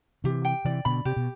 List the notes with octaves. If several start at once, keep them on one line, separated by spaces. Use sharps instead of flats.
C3 E3 G4
G5
C3 E3 D5
B2 D3 B5
C3 G4
B2